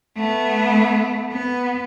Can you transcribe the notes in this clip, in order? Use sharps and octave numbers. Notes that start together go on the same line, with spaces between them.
A3 B3
B3